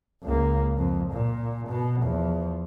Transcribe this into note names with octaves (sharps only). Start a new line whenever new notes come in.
C#2 A#3
F2
A#2
B2
E2 F3